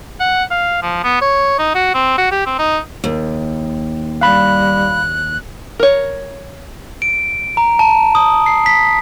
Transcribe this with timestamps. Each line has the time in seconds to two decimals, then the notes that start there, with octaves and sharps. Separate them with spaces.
0.20 F#5
0.51 F5
0.82 F3
1.04 B3
1.22 C#5
1.59 D#4
1.75 F#4
1.95 C4
2.18 F#4
2.31 G4
2.46 C4
2.59 D#4
3.04 D#2
4.21 G3 F5 B5 F#6
5.79 A#4 C#5
7.02 D7
7.57 A#5
7.79 A5
8.15 D#6
8.46 C7
8.66 B6